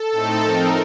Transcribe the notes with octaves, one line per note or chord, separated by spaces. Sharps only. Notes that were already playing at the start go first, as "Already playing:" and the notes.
Already playing: A4
A2 A3 C4 D#4
F3 C4 D#4 A#4